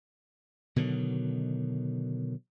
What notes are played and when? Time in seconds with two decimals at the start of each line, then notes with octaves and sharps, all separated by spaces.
0.76 B2 D3 D#3 F#3